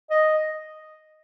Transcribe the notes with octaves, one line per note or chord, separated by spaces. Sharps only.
D#5